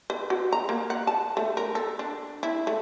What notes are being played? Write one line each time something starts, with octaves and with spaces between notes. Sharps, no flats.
B4
F#4
A#5
A#3
F#5
A5
A3
A#4
A4
D4
E4
A3